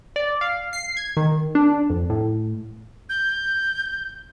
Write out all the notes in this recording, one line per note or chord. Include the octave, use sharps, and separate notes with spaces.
D5
F5
C7
G#6
D#3
D4
F2
A2
G6